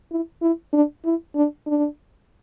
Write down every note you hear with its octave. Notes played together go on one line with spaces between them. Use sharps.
E4
E4
D4
E4
D4
D4